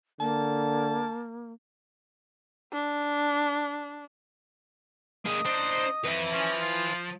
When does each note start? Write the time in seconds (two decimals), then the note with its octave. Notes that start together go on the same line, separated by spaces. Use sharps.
0.20 D3 A#3 A5
2.73 D4
5.26 A#3 G#4 D#5
5.46 D4 D#4 C5
6.05 F2 B4 E5
6.33 F3 C#4
6.61 F4